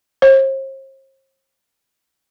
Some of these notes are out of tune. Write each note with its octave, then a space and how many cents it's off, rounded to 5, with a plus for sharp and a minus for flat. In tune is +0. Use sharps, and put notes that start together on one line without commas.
C5 +45